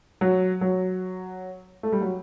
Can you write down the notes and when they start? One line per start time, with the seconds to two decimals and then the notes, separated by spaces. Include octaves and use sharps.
0.21 F#3
0.61 F#3
1.83 A3
1.92 G3
2.02 F#3